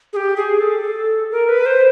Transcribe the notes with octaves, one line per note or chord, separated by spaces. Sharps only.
G#4
G4
G#4
A4
A#4
B4
C5